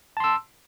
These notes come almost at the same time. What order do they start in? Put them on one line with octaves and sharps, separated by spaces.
A5 C6 E6